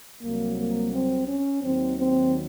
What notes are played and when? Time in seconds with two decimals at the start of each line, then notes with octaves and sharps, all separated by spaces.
0.23 C2 C3 F#3 A#3
0.58 A#3
0.93 C4
1.28 C#4
1.63 D#2 D#3 F#3 C4
1.98 C4